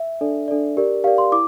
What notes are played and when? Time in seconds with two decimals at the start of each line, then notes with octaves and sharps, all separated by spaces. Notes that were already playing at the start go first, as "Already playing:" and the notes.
Already playing: E5
0.21 D4 A4 D5
0.48 D4 A4 D5
0.77 G4 A#4 D5
1.04 G4 A#4 D5 F5
1.18 C6
1.32 E4 D6